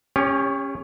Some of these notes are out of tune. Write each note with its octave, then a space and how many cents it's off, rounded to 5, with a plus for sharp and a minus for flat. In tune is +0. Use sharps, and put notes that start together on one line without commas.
C#4 -10 G4 +35 C#5 +30